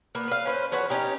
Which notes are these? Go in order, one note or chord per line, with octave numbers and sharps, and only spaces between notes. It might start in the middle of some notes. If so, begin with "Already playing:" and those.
A#3 B3
B4 F5
C#4 B4 C5
F3 C#4 F#4 B4
C#4 D#4 G4